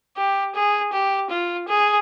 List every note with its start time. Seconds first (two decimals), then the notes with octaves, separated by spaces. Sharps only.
0.17 G4
0.55 G#4
0.92 G4
1.30 F4
1.68 G#4